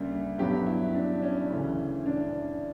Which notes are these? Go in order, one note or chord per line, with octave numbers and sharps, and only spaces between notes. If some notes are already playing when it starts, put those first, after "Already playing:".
Already playing: D2 C#3 G3 A#3
G2 F#3 B3 G4
E4
D4
C#4
D2 C#3 E3
D4